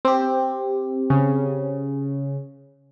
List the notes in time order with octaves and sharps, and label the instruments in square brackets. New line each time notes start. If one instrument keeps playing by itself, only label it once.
[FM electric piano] C4 G4
[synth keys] C#3